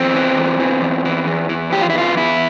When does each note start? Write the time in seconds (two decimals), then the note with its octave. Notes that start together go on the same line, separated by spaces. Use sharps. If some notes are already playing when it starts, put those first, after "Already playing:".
Already playing: E2 C4
0.14 E3
0.38 E2
0.60 E3
0.82 E2
1.05 E3
1.27 E2
1.49 E3
1.72 E2 G4
1.81 F4
1.90 E4
1.95 E3 F4
2.17 E2 E4